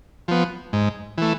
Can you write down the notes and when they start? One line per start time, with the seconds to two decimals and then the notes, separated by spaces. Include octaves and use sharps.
0.28 F3 B3
0.73 G#2
1.18 E3 A3